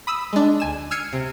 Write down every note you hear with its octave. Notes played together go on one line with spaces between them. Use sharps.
B5 D#6 E6
G#3 D4
D2 G#5 E7
E6 F6 G#6 C7 C#7 D#7
C3